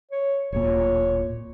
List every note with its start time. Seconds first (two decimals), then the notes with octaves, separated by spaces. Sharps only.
0.11 C#5
0.52 D1 A#2 C#5